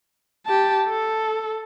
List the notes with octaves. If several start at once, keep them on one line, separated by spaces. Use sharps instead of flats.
G4 A5
A4